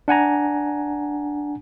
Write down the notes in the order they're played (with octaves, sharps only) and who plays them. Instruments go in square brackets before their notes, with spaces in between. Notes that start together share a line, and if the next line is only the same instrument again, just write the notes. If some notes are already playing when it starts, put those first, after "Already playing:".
[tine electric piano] D4 F#5 G#5 A#5